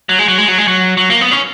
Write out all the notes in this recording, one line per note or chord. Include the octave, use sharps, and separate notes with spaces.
F#3
G#3
F#3
G#3
F#3
G#3
F#3
F#3
A#3
B3
C#4